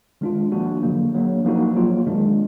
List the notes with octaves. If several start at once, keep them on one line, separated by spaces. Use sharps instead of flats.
D#3 G#3 D4 F4
F3 A#3 D4 F#4
D3 F#3 A#3
F#3 A#3 D4
F3 A#3 D#4 F#4
F#3 A#3 F4
D#3 G#3 D4